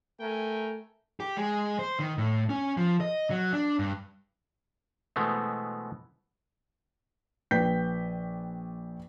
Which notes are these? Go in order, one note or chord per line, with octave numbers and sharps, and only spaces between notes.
A3 A#4 G5 G#5
G4
G#3
C5
D#3
A2
C#4
F3
D#5
F#3
D4
G2
B2 E3 G#3 A3 B3 C4
A#1 B4 G5 G6 B6